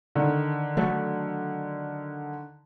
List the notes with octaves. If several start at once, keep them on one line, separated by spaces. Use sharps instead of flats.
D3 D#3
F#3 A3